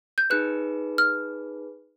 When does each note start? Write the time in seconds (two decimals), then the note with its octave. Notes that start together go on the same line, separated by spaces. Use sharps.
0.18 G6
0.30 D#4 G#4 B4 F#6
0.98 F6